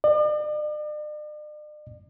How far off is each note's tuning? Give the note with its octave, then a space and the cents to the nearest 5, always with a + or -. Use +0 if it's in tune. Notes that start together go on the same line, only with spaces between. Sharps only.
D5 +45